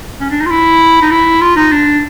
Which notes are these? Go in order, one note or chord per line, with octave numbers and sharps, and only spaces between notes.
C#4
D4
D#4
F4
E4
D#4
E4
F4
D#4
D4